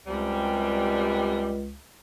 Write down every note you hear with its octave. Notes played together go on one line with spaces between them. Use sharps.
C#2 F#2 C3 G3